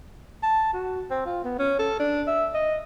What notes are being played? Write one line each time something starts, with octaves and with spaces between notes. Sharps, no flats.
A5
F#4
C4
F4
B3
C#4
A4
D4
E5
D#5